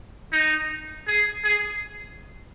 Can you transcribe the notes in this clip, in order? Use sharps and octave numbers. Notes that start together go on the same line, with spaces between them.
D#4
G#4
G#4